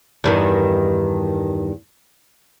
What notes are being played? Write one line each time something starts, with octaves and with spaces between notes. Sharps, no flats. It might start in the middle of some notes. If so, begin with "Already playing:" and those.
E2 G2 D#3